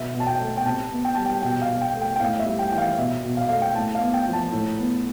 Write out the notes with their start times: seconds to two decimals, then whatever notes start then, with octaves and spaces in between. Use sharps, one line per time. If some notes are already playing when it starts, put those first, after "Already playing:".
Already playing: B2 E5
0.13 B2
0.20 A5
0.27 G5
0.40 A3
0.57 G5
0.65 C3 A5
0.91 B3
1.05 G5
1.15 G3 A5
1.26 G5
1.42 B2 G5
1.62 F5
1.69 B2
1.81 G5
1.94 A3
2.02 G5
2.16 G5
2.20 A2 F5
2.39 E5
2.46 G3
2.59 G5
2.72 E3 G5
2.78 F5
2.98 B2 E5
3.24 B2
3.37 F5
3.49 A3 F5
3.62 G5
3.75 A2 A5
3.95 F5
4.01 B3
4.14 G5
4.27 F3
4.33 A5
4.52 A2
4.79 B3